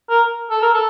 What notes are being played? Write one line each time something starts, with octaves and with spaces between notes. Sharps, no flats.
A#4
A4
A#4
A4